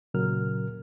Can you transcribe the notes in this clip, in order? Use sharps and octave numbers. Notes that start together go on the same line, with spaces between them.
A#2 C#3 F#3 A#4 F6